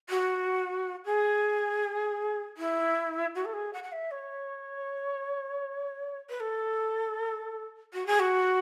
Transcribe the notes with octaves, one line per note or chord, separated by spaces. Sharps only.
F#4
G#4
E4
F#4
A4
G#4
F#5
F#5
E5
C#5
B4
A4
F#4
G#4
F#4